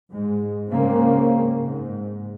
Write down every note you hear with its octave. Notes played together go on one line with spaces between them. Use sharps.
G#2 G#3
C#2 G#2 C#3 A#3 C4 C#4
G#2